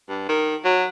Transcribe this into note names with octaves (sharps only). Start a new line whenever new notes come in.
G2
D#3
F#3